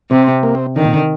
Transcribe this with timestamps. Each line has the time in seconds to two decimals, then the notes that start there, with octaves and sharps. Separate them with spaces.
0.10 C3 C4
0.43 A#3
0.55 C4
0.76 D3 D#3
0.85 A#2
0.94 D3